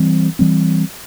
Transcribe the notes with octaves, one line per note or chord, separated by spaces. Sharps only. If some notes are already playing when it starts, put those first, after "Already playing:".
Already playing: E3 G3 C4
E3 G3 C4